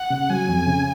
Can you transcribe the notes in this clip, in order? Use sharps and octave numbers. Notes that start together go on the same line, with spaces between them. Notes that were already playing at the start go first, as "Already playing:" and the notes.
Already playing: F#5
C#3
F#3 G#5
F2
C#3